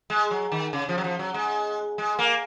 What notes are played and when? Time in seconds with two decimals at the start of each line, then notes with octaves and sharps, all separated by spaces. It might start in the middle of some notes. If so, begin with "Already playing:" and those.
0.10 G#3
0.31 F#3
0.52 D#3
0.73 C#3
0.89 F3
0.98 F#3
1.04 F3
1.19 F#3
1.34 G#3
1.98 G#3
2.19 A#3